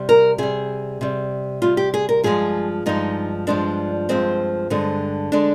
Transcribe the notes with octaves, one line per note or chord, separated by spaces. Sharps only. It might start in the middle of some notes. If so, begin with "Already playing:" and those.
Already playing: C3 G3
A#4
C3 G3 G#4
C3 G3
C3 G3 F4
G4
G#4
A#4
G2 F3 G#3 G#4
G2 F3 G#3 D#4
G2 F3 G#3 D4
G2 F3 G#3 C4
G2 D3 G#3
D3 G#3 D4